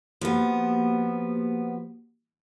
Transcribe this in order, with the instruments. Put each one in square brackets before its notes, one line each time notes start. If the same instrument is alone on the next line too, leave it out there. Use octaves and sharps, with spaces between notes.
[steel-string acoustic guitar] F3 B3 [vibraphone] A#3 F#4 G4